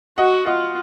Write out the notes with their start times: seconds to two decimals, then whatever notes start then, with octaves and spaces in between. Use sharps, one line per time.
0.18 F#4 D#5 F#5
0.46 F4 D#5 F#5